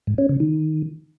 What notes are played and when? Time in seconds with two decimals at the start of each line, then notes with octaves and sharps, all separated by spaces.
0.07 G#2
0.18 C#4
0.29 C#3
0.40 D#3